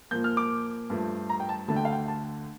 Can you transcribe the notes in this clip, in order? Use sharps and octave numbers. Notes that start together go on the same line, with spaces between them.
A#2 F3 A#3 G6
F6
D6
G2 F3 A3
A#5
G5
A5
D2 D3 A3 D4 A5
G5
F5
G5
A5